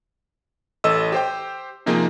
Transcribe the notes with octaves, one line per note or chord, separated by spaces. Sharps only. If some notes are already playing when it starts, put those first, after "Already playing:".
A1 A4 D#5 E6
G4 C5 G5
C3 F3 A#3 D#4 G#4